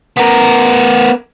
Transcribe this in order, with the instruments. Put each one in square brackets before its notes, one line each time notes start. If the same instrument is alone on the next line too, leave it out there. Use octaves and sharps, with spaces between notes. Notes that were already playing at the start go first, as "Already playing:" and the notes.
[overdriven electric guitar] B3 A#4